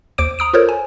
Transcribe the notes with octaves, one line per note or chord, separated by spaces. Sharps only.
D#2 C5 D6 D7
A#5 D#6 D7
F4 A4 A#4 C5 C#5
G#5